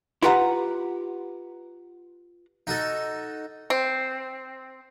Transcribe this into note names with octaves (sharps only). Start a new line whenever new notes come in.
E4 F4 G4 B4 F#5 A#5
D#4 F#4 A4
C4